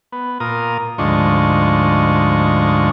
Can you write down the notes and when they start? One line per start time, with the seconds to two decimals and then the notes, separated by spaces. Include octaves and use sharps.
0.12 B3
0.40 A#2 F4 A#4 D#6
0.98 D2 G#2 F3 D4 D#5 C#6